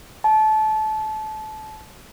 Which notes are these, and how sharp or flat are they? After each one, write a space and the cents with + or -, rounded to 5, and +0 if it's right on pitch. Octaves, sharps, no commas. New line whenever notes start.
A5 -25